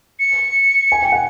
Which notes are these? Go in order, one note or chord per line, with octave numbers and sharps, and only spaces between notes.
C#7
G#5
G5
F#5